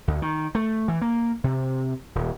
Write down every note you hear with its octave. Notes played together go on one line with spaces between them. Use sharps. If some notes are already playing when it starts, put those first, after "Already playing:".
D2
D#3
A3
E3
A#3
C3
D#1